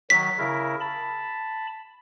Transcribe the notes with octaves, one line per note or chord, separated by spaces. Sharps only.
D#3 F#3 B6
C#3 E4 A#4
A5 B5